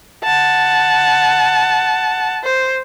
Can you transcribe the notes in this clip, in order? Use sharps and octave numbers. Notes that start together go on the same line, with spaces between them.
F#5 A5
C5